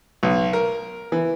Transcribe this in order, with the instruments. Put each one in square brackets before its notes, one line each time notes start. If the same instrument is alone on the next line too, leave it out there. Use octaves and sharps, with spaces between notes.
[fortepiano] B1
A#4
E3